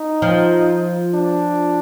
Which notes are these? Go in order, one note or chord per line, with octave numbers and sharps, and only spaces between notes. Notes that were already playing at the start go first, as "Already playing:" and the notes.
Already playing: D#4
F3
D4